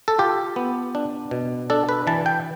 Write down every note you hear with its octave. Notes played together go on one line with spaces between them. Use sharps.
A4
F4 G4
B3
D4
B2
D4 A4
B4
E3 A5
G5